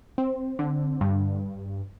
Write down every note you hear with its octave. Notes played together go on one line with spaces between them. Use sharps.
C4
D3
G2